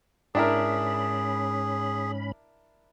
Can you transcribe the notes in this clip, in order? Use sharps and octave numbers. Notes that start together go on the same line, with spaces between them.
G#2 C#4 D4 E4 G#4 A#4 B5